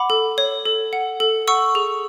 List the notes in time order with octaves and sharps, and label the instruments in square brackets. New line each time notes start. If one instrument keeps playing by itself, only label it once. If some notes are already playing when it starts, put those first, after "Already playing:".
Already playing: [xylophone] F#5 B5 D6
A4
C#5
A4
F#5
A4
F#5 C#6 E6
G#4